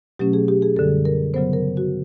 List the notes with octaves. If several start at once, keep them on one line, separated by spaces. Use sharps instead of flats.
B2 F#3 A3 C#4 G4
G#4
G4
G#4
F#2 D3 G3 A4
A#4
C#3 F#3 B3 C5
A#4
F#4